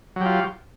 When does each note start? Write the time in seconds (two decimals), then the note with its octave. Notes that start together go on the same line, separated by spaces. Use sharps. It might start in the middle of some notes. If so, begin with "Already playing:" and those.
0.16 F#3
0.21 G4
0.26 F4